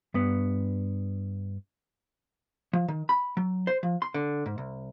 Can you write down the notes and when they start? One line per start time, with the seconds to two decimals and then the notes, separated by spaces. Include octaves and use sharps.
0.14 G2 B3
2.73 F3
2.88 D#3
3.09 B5
3.37 F#3
3.67 C5
3.83 F3
4.02 C6
4.14 D3
4.46 G#2
4.58 C2